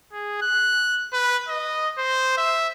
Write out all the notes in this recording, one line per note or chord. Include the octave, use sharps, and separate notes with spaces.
G#4
F#6
B4
D#5
C5
E5